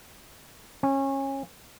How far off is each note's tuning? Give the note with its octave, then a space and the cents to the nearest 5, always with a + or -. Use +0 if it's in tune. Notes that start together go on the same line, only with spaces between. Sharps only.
C#4 -25